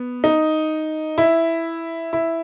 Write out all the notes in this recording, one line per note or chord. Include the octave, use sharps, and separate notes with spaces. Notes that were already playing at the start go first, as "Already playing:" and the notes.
Already playing: B3
D#4
E4
E4